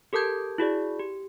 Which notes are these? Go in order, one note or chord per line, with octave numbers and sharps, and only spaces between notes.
G4 A4 A#4 A5 G6 G#6
E4 F#4 G#4 D5
G4